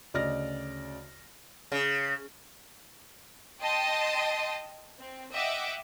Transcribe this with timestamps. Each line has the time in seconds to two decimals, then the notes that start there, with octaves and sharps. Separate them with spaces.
0.14 D2 C#3 D5 D#5 F6 A#6
1.72 C#3
3.61 D#5 G5 A5 C6 D#6
5.00 C4
5.33 D#5 E5 F#5 G5 D6